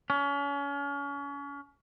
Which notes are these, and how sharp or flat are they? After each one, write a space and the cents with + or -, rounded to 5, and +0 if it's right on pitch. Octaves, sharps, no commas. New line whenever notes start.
C#4 +35